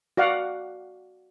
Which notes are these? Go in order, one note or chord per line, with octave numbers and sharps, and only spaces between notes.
F#4 D5 F5 F#5